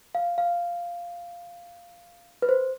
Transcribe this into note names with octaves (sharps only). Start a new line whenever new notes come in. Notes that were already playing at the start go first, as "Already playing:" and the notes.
F5
F5
B4
C5